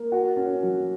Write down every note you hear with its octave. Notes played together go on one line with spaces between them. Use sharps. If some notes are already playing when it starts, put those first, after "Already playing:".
Already playing: A#3
F#4
C#4
F#3